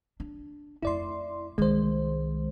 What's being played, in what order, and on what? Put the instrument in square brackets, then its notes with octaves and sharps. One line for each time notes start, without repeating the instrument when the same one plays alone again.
[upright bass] D4
[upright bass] F2 A3 [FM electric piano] E4 D5 C6
[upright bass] C2 D#3 [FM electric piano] G#3 C5